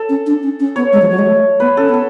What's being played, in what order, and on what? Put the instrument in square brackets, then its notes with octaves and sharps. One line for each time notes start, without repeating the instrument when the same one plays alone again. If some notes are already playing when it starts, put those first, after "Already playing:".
Already playing: [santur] A4
[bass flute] C#4
D4
C#4
C#4
[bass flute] B3 [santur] C#5
[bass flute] G#3
F3
F#3
G#3
A3
[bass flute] B3 [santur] B4
[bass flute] C#4 [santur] A4
[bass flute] B3 [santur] A4